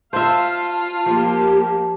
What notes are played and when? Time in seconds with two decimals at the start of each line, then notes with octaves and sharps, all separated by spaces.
0.13 F4 C5 E5 F5 A5
1.06 F3 A#3 G4